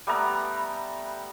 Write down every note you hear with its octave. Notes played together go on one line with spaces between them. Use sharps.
G3 A3 B3 A#5